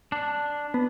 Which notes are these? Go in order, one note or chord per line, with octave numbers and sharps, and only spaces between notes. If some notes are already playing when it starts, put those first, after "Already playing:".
D4
B3